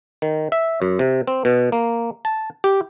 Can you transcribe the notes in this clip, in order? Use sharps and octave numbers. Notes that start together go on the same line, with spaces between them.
D#3
E5
F#2
C3
C4
B2
A#3
A5
G4